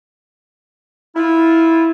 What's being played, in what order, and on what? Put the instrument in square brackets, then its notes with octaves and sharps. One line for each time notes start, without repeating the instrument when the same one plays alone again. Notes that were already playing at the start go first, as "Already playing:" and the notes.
[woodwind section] E4 F4